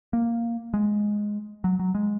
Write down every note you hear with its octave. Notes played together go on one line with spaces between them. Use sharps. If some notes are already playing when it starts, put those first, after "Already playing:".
A#3
G#3
F#3
F#3
G#3